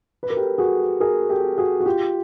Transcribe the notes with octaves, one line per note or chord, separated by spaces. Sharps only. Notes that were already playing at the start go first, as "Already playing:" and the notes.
B4
A#4
G4 A4
F#4 G#4
G#4 A#4
G4 A4
F#4 G#4
F#4
F4 G4